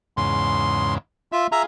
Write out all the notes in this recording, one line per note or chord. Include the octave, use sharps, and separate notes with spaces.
E2 G#2 C#3 C6
F4 E5 E6
F4 G#4 E5 A#5